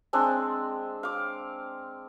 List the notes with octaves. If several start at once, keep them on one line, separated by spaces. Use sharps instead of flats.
G#3 C4 D4
F5 D6